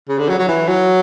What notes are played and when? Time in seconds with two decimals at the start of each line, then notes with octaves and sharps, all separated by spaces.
0.09 C#3
0.18 D3
0.29 F#3
0.39 F#3
0.48 E3
0.68 F#3